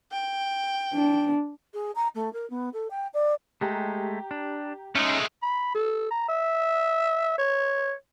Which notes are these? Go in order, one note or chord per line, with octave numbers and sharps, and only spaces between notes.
G5
D4
G#4
A#5
A3
A#4
B3
A4
G5
D5
G#3 A3 G4 A#5
D4
G#3 A3 C#4 D#4
B5
A4
A#5
E5
C#5